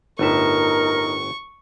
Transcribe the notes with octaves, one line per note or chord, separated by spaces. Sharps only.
G1 A2 D#4 A#4 E5 C#6